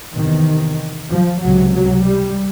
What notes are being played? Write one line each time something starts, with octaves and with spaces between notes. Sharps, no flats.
E2 C3 D#3
F3
C#2 C3 F#3
F#3
G3